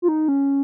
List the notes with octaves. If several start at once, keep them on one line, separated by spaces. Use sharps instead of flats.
F4
D#4
C#4